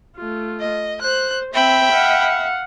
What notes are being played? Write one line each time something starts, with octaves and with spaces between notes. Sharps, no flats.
A3 F4
D#5
C5 F#6
C4 C5 E5 G5 B5
F5 F#5